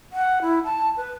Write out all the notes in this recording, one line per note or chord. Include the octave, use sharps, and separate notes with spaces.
F#5
E4
A5
B4